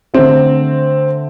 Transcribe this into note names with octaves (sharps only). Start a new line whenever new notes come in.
D3 A3 C4